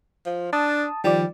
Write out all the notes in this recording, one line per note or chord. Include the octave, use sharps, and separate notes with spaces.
F3
D4 A5 D#6
D#3 F3 G3 D5